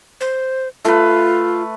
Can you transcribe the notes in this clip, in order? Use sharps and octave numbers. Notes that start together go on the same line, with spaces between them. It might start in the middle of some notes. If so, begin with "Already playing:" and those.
C5
A3 F4 B4